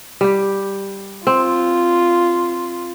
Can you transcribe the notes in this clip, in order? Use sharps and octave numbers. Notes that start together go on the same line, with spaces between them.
G3 G4
C4 F4